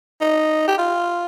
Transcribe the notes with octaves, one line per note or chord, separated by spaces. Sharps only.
D#4
G4
F4